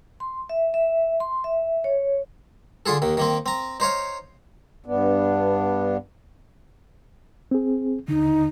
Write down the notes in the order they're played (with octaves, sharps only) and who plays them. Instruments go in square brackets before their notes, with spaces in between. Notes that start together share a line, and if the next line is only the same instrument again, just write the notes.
[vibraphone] C6
E5
E5
C6
E5
C#5
[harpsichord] D3 F4 G#4 A4
D#2 D#3
D#3 A#3 C4
C4 A#5
D#4 C5 C#5 F5
[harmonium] G2 B3 D4
[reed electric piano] C4 G#4
[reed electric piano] D#2 D3 [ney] D#4